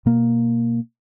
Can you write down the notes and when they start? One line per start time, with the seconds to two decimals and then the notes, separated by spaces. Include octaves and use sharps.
0.06 B2 A#3